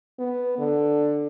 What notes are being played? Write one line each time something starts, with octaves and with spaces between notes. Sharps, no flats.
B3
D3